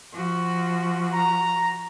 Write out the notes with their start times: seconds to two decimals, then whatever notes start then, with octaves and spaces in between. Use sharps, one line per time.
0.12 F3 F#4
1.14 A#5